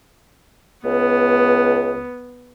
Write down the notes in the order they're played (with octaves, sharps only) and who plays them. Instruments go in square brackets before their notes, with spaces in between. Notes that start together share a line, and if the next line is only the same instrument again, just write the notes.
[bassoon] C#2 [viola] B3